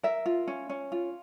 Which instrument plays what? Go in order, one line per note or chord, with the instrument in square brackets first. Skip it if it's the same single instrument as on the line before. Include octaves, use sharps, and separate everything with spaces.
[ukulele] A#4 E5
F4
C#4
C#4
F4